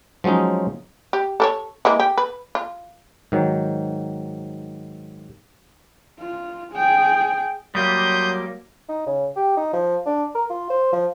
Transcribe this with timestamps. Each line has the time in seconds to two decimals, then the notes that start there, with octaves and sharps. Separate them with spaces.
0.24 F3 F#3 G#3 C#4 D#4
1.13 G4
1.40 A4 A#4 C#5
1.85 E3 G#3 A#3
2.00 G4
2.18 B4
2.55 F4
3.32 G#2 D#3 F#3
6.20 F4
6.73 G#4 G5
7.75 F#3 G3 A#3 C6 D#6 G6
8.89 D#4
9.07 C#3
9.36 G4
9.57 D#4
9.73 F3
10.06 D4
10.35 A#4
10.50 F4
10.70 C5
10.93 F3